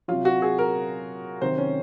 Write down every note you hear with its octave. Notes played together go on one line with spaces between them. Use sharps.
C3 F#3 F4
F#4
G#4
A#4
C3 D#3 F#3 C5
C#4